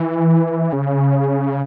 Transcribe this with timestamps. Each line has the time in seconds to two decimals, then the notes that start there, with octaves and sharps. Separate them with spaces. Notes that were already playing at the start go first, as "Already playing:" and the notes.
Already playing: E3
0.73 C#3